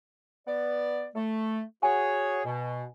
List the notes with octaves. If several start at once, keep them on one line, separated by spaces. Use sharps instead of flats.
B3 D5
A3
F#4 G#4 C#5 G#5
B2